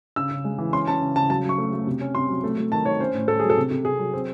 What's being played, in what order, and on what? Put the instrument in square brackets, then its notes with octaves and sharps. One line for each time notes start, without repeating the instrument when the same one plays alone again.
[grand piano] C#3 E6
C#3
G#3
E3
C#4 C6
C#4 A5
C#3
C#3 A5
F#3 A5
F#3 C#6
A3
A3
C3
C#4
C3 C6
F#3
A3
A3
D#3 A5
D#3 C#5
C#4 C5
A2
A2 A4
F#3 G#4
A4
C3
C3
C3 G#4
F#3
C4